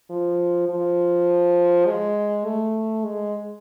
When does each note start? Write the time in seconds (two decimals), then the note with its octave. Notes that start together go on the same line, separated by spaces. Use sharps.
0.10 F3
0.69 F3
1.86 G#3
2.45 A3
3.05 G#3